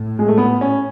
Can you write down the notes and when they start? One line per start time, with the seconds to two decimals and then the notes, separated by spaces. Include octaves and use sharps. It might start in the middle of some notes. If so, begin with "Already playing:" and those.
Already playing: A2
0.19 G#3
0.28 A3
0.38 B3
0.61 C#4